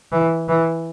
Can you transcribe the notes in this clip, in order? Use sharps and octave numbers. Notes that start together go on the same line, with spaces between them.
E3
E3